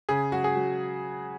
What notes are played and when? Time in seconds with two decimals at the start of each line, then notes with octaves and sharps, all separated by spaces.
0.09 C#3 G#4
0.32 F#3 F#4
0.44 G#4
0.56 F#3